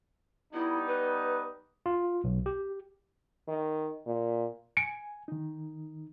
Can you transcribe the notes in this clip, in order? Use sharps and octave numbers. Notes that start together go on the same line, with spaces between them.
G3 B3 D#4 E4
B4
F4
B1
G4
D#3
A#2
G#5 C#7 D7
D#3 D#4